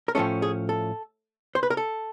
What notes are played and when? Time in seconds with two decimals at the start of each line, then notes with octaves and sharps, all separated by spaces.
0.08 A#4
0.15 A2 F3 A3 C#4 A4
0.42 G#4
0.69 A4
1.55 C5
1.63 B4
1.70 A#4
1.77 A4